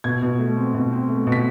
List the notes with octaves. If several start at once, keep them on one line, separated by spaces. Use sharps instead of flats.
B2 G#6
B2
A3
C4
B2
C4
A3
B2
B6